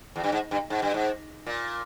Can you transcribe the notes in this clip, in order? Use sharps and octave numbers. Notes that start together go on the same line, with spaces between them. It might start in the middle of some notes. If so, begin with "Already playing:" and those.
E2
G2
G#2
G2
G#2
G2
G#2
A#2